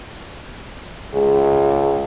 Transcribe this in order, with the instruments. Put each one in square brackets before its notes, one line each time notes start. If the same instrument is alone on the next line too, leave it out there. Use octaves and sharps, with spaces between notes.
[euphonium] C#2 [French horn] G#4